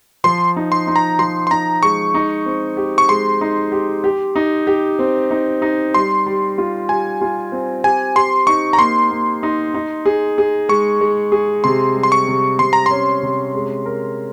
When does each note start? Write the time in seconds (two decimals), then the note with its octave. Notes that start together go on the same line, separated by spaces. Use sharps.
0.24 F3 C6
0.56 D#4
0.72 C6
0.87 D#4
0.96 A#5
1.19 F3 C6
1.47 C6
1.51 D#4 A#5
1.83 G#3 C#6
2.14 D#4
2.46 C4
2.77 G4
2.98 C#6
3.09 G#3 C6
3.41 D#4
3.72 G4
4.04 G4
4.36 D#4
4.67 G4
4.99 C4
5.31 D#4
5.62 D#4
5.94 G3 C6
6.26 G3
6.58 F4
6.89 G3 G#5
7.21 F4
7.52 C4
7.84 G4 G#5
8.16 G4 C6
8.47 D#4 C#6
8.73 A#5
8.79 A#3 C6
9.11 A#3
9.43 D#4
9.74 D#4
10.05 G#4
10.38 G#4
10.69 G#3 C#6
11.01 G#3
11.32 G#4
11.64 C3 C6
11.96 G3
12.03 C6
12.12 C#6
12.28 C3
12.59 C3 C6
12.73 A#5
12.86 C#4 C6
13.23 C3
13.55 G#3
13.86 A#4